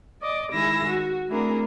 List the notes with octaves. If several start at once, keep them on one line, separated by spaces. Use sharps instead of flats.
D5 D#5 D6
D#3 G#3 E4 G#4 E6 A#6
F#4
A3 C4 D4 E4 G#4 A#4